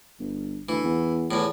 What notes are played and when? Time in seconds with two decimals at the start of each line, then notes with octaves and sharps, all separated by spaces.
0.20 G1
0.69 D2 E3
0.85 E2
1.31 E2 A2